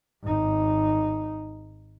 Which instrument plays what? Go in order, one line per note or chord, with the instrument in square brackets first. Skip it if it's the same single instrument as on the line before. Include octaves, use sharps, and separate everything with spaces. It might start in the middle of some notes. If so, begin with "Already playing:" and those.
[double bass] G#1 D#4